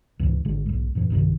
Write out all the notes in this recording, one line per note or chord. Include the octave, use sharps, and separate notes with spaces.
C#2 G#2 B2 E3
G#1 D3 G#3
B1 G#2
F#2 A#2 E3
B1 G2 C3 D#3